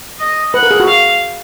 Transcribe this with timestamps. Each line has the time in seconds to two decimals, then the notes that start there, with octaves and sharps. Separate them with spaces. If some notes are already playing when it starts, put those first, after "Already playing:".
0.19 D#5
0.54 B4 F#5
0.63 A#4
0.71 G#4
0.80 F#4
0.87 F5